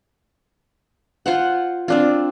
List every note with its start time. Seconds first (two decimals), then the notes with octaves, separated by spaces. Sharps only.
1.26 F4 C5 F#5
1.88 C4 D4 F4